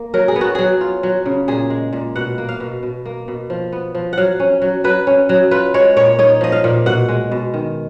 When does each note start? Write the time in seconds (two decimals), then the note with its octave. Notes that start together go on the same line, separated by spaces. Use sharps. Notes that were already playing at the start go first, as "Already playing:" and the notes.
Already playing: A#3
0.14 F#3 A#4
0.28 G#4
0.36 B3
0.41 F#4
0.55 F#3 G#4
0.81 F4
1.03 F#3
1.26 C#3
1.48 A#2 G#4
1.70 G#3
1.93 A#2
2.16 B2 F#5
2.38 A#3
2.49 F5
2.60 B2
2.83 B2
3.06 A#3
3.28 B2
3.50 F3
3.72 B3
3.95 F3
4.13 F#3 F5 F#5
4.40 C#4
4.62 F#3
4.84 F#3 B4
5.07 C#4
5.29 F#3
5.51 F4 B4
5.74 G#3 C#5
5.96 A#2 C#5
6.19 D#4 C#5
6.41 F3 D#5
6.52 F5
6.64 A#2
6.86 B2 F#5
7.08 G#3
7.32 B2
7.54 D#3